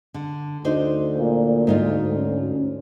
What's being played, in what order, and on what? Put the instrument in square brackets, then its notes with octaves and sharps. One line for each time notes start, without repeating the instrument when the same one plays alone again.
[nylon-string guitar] D3
[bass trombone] D2 [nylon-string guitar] D4 D#4 C5
[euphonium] A#2
[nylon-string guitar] G#2 D#4 F4
[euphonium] C#4